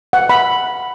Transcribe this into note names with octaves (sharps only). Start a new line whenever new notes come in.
F#5
B5